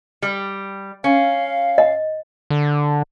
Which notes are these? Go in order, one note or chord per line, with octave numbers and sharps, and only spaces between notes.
G3
C#4 F5
D#5
D3